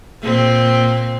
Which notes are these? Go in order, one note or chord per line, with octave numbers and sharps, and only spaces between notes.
A#2 C4